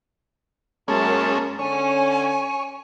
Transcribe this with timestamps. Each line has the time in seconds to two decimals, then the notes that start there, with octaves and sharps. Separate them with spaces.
0.88 F#2 G#3 A#3 C#4 A5
1.59 D3 C#4 C#5 G#5